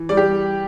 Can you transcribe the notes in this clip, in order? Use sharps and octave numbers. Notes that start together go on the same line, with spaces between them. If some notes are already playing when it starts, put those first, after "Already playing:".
Already playing: E3
G3 D5
G4